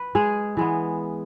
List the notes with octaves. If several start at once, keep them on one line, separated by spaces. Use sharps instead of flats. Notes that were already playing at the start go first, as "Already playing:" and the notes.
Already playing: B4
G#3 G#4
E3 G#3 B3